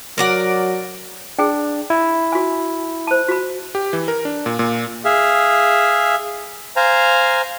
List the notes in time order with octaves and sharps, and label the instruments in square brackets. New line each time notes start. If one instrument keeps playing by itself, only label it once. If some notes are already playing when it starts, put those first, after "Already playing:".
[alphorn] F#3 [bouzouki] A#4 D5 F#5
[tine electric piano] D4 [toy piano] G#4 G5
[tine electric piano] E4
[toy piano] F#4 G#5
C5 A5
F#4 B5
[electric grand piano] G4
E3
A#4
D4
A#2
A#2
[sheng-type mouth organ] G#4 E5 F5
C5 F5 G#5 A#5